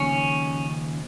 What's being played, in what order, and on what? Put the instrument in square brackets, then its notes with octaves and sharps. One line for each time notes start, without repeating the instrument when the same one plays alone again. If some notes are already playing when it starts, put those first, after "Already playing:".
Already playing: [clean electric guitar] D#2 C#3 F3 C#4